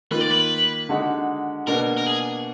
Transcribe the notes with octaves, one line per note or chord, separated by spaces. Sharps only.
D#3 A#3 F4 B4
D5
B4
D3 G#3 D#4 F#4
B2 A#3 D4 F#4 A#4
A#4
G#4